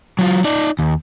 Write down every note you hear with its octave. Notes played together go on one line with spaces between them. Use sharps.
F#3 F4
D#4 D5
D#2